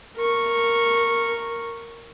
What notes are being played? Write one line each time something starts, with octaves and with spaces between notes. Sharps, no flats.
A#4 C#6